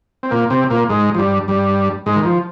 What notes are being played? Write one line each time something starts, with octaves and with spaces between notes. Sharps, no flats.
C4
A#2 A#3
C3 C4
A#2 A#3
G#2 G#3
F3
G2 G3
G2 G3
G#2 G#3
D#3
F3